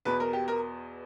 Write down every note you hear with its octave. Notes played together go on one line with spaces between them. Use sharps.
E2 B2 B4
A#4
G4
A#4